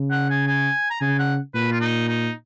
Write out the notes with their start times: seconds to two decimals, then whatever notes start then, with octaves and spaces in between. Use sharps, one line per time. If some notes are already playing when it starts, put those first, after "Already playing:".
Already playing: C#3
0.11 F#5
0.30 G#5
0.47 G#5
0.90 A#5
1.00 C#3 G#5
1.19 F#5
1.54 A#2 B4
1.72 F4
1.81 D#4
2.08 D#4